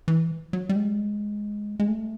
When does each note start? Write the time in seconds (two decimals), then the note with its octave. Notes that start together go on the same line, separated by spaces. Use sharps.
0.08 E3
0.53 F#3
0.69 G3
0.76 G#3
1.80 G#3
1.88 A3